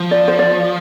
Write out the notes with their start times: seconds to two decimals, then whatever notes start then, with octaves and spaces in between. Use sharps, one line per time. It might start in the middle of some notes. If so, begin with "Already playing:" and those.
Already playing: F3
0.11 D5
0.28 C5
0.39 D5